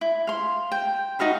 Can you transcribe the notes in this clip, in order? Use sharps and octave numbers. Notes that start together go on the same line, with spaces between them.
E4
F5 C6
G5
D#4 F#4 F5 B5